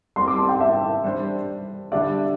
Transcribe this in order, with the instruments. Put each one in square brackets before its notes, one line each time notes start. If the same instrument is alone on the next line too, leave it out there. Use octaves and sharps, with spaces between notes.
[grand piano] G3 C4 G4 [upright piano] C6
[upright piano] D6
A5
G5
E5
[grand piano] G3 D4 C5
[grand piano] D3 G3 D4 G4 D5 [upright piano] E5